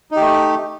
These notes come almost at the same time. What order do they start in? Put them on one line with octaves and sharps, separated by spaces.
D#4 G4 A3